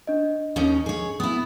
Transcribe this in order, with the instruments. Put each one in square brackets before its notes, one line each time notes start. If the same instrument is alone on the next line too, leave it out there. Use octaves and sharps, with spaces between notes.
[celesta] D4 D#5
[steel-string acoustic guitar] D#2 C#4 D#4
G#4 C#5
[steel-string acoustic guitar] B3 E4 [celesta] D#6